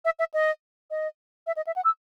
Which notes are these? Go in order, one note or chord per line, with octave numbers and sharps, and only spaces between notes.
E5
E5
D#5
D#5
E5
D#5
E5
F#5
E6